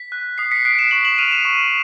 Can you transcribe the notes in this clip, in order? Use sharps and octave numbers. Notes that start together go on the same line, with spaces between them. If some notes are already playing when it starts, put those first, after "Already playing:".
Already playing: B6
F#6
D#6 C7
B6 C#7
F#6 C7 D7
D7 E7
C#6 E7 F#7
E7 F#7
F6 D#7 F7
D7 E7
C#6